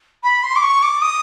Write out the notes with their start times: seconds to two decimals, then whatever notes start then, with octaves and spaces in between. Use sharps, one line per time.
0.23 B5
0.43 C6
0.56 D6
0.62 C#6
0.83 D6
1.02 D#6